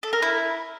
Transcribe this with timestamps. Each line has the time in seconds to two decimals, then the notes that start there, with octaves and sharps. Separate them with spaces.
0.03 A4
0.13 A#4
0.22 E4